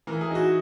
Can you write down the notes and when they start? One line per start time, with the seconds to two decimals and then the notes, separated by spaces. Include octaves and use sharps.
0.07 E3 A#4
0.21 G#4
0.31 D#4 F#4